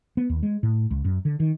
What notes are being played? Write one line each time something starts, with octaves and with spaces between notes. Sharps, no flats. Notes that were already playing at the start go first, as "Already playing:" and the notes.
B3
D#2
G#3
A2
C#2
F#2
D3
D#3